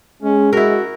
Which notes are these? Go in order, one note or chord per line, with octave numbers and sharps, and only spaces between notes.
G#3 C#4
E4 F#4 A#4